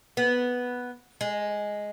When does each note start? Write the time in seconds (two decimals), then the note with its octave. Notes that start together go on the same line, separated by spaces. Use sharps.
0.17 B3
1.21 G#3